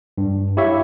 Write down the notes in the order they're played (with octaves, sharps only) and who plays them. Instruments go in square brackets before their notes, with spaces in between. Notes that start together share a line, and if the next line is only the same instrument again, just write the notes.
[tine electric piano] G2
E4 G4 C#5 E5 F5